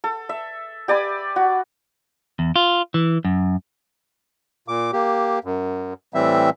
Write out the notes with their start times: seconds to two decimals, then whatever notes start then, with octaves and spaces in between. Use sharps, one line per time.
0.04 A4
0.29 E5
0.88 G4 D5 G#5 B5
1.36 F#4
2.39 E2
2.56 F4
2.94 E3
3.25 F#2
4.68 A#2 D6
4.93 A#3 G4
5.44 F#2
6.14 A2 E3 G3 C4 E5